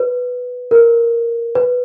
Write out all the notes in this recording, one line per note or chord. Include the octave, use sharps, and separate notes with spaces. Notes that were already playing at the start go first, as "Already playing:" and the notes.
Already playing: B4
A#4
B4